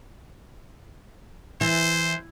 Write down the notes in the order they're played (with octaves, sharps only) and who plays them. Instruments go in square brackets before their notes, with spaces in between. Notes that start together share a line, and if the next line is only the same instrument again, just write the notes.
[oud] E3 [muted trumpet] C5